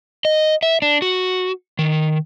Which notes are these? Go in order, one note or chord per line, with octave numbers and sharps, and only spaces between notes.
D#5
E5
D4
F#4
D#3